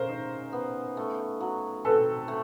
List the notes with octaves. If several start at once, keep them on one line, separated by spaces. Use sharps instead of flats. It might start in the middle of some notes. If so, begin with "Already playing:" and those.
Already playing: C#3 A#4 C5
D#4
B3
A3
F#3
C4 A4 B4
A3